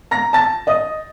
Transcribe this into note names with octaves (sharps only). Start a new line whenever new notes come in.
A#5 A#6
A5 A6
D#5 D#6